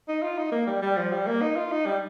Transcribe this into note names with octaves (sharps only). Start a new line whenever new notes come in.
D#4
F4
D#4
A#3
G3
G3
F3
G3
A#3
D#4
F4
D#4
G3